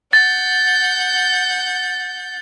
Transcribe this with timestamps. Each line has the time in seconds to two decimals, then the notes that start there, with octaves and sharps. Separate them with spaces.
0.13 F#5 G6 A6